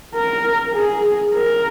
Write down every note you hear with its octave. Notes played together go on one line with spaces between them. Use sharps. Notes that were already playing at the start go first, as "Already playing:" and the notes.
A#4
G#4
A#4